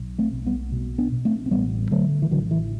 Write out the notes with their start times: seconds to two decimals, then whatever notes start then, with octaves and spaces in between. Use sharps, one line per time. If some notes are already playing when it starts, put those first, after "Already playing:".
Already playing: B1
0.19 A3 C4
0.33 B1
0.46 G3 B3
0.72 B2
0.98 B3 D4
1.12 B2
1.25 A3 C4
1.46 C4
1.51 A1 G3 B3
1.91 D3 F#3 A3
2.22 E3
2.31 A1 D3 F#3
2.51 E3